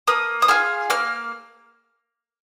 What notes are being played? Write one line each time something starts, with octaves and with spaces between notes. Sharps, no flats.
A#3 D#6
D#6
F4 G#4 F6
A#3 F6